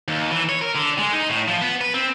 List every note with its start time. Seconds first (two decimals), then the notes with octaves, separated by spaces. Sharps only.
0.08 D#2
0.31 E3
0.49 C#5
0.62 A#4
0.76 D3
0.99 G#3
1.13 D#4
1.30 A2
1.48 F3
1.62 B3
1.81 B4
1.94 C4